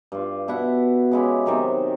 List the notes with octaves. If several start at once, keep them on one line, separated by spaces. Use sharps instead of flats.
G2 F4
B2 E4 E5 F#5
C#3 G#3 E4 G4
C3 D#3 F#3